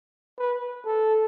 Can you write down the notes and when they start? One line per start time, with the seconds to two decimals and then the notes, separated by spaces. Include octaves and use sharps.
0.38 B4
0.86 A4